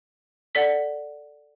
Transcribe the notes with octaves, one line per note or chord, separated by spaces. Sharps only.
A4 D5 F#5 B6